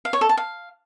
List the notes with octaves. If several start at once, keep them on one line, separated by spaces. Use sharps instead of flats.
F5
C#5
A4
A5
F5